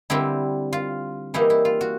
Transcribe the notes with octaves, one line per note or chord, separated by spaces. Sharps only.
D3 G3 C4 E4
F4
E3 G3 A#3 D#4 E4
E4
F4
F#4